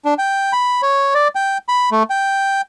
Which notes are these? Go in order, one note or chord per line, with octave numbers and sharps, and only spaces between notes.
D4
G5
B5
C#5
D5
G5
B5
A3
G5